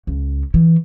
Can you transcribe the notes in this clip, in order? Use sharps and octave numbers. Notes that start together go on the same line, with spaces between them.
C#2
E3